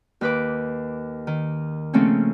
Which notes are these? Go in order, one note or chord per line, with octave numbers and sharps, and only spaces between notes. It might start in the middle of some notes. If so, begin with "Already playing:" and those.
D#2 B4 D6
D#3
C#3 F3 A3 A#3 C4 C#4